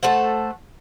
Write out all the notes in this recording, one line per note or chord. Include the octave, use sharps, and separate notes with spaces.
A3 A4 C5 F#5